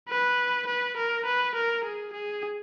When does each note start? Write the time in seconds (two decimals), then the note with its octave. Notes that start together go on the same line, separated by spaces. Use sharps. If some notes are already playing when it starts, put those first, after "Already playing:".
0.09 B4
0.67 B4
0.97 A#4
1.25 B4
1.55 A#4
1.84 G#4
2.13 G#4